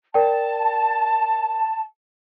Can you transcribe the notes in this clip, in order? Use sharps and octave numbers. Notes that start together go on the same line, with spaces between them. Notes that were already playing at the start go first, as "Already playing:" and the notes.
A#4 D5 G5 A5